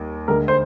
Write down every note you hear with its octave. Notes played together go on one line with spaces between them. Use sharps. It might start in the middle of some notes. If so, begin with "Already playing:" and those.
Already playing: D#2 G3
D2 D3 G#3 A#4
C5